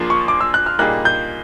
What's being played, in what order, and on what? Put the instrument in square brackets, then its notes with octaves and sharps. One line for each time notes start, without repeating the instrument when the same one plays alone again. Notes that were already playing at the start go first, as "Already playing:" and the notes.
Already playing: [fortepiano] F3 A#3 D4 F4 G#4
[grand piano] C#6
D6
E6
F#6
F6
[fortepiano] A#2 G3 A#3 D#4 G#4 [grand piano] F#6
[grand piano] G6